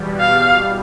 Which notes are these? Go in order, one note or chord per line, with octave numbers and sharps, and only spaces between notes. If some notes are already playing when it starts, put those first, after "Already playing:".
Already playing: E2 B2 G3
F5